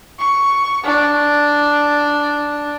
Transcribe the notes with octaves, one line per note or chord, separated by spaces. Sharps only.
C#6
D4